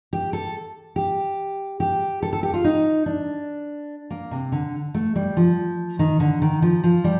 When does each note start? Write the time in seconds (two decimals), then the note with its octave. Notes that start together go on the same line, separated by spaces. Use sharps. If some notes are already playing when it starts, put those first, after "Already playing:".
0.13 G4
0.33 A4
0.96 G4
1.80 G4
2.22 A4
2.33 A4
2.43 G4
2.54 F4
2.64 D#4
3.06 D4
4.10 A#3
4.31 C3
4.52 D3
4.94 A3
5.16 G3
5.37 F3
5.99 D#3
6.20 D3
6.42 D#3
6.62 F3
6.84 F3
7.04 G3